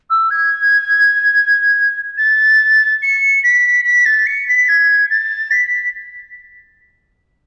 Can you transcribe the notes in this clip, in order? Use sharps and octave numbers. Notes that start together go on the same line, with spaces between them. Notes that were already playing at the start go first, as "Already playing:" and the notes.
E6
G#6
A6
C#7
B6
B6
A6
C#7
B6
G#6
A6
B6